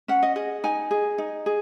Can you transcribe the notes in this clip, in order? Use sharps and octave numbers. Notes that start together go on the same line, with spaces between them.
C#4 F#5
D#5
G#4 D#5
D#4 G#5
G#4
D#4
G#4